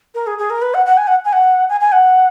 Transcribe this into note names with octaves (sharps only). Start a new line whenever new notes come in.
A#4
G#4
G#4
A#4
B4
F#5
F#5
G#5
F#5
G#5
F#5
G#5
G#5
F#5